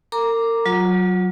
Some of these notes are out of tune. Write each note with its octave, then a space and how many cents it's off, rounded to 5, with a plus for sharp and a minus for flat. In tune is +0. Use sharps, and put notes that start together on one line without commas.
A#4 -35 A#5 +5 D6 +0
F#3 +0 F4 +35